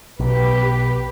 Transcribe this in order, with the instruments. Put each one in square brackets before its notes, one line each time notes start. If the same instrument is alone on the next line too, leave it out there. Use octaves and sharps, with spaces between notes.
[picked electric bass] B1 [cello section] G4 B4